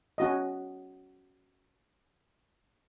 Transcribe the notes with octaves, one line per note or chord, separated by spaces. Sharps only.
C#4 F#4 D#5